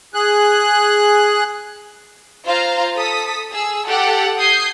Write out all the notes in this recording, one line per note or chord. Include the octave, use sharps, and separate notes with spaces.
G#4 F#6
F4 C5 F5 A#5
A4 D#6 B6
G#4 E6
G4 A4 F#5
D#6 G6 G#6 C7